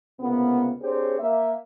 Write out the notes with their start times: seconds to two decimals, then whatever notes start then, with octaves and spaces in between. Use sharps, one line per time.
0.20 C#2 C3 A#3 B3
0.81 C4 D4 G4 G#4 C5 C#5
1.20 A#3 E5